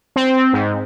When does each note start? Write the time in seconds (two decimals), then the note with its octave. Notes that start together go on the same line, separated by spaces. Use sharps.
0.16 C4
0.53 G#2